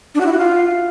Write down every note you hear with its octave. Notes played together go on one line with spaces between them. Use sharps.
D4
F#4
E4
F#4
F4